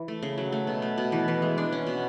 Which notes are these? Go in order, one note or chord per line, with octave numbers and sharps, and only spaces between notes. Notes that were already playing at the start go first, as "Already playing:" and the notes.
Already playing: E3
A3
C#3
F#3
A3
B2
A3
B2
E3
E3
G#3
D4
C#4
B2